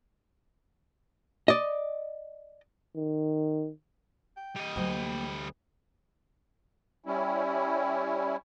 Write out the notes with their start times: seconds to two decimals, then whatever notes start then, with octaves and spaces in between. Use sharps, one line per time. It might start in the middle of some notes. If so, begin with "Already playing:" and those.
1.48 D5 D#5
2.95 D#3
4.37 G5
4.56 G3 D#5
4.76 D2 F#3 A#3 G5
7.06 G3 C#4 E4